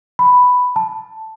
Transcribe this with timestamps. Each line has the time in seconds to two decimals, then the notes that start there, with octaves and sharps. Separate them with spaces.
0.19 B5
0.76 A5